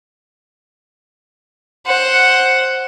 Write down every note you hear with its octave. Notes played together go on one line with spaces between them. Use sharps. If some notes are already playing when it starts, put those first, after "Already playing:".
C5 F#5